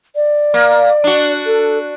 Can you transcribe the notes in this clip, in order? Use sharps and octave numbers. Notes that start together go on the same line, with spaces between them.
D5
A#3
D4 F#4
A4